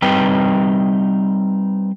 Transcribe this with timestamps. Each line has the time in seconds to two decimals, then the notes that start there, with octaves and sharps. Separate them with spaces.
0.02 G3 C4 D#4 B4 G5